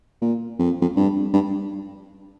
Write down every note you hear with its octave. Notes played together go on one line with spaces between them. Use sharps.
A#2
F2
F2
G2
G2